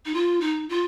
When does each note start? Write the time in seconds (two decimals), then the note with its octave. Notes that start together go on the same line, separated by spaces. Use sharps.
0.05 D#4
0.14 F4
0.40 D#4
0.69 F4